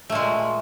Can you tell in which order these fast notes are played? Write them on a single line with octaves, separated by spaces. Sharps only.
A3 A#2 G#3